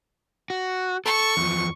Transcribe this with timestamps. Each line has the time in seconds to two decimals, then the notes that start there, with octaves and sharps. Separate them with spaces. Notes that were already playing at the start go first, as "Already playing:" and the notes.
0.50 F#4
1.06 A4 C#6
1.37 E2 F3